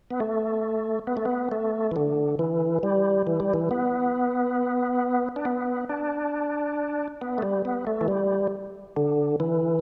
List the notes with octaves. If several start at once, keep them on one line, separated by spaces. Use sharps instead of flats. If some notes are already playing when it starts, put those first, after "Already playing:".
B3
A3
B3
A3
B3
A3
E3
D3
E3
G3
E3
G3
E3
B3
D4
B3
D4
B3
A3
G3
B3
A3
E3
G3
D3
E3